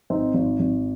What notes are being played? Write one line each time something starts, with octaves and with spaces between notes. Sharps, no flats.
G#1 C4 D#4
G#1
G#1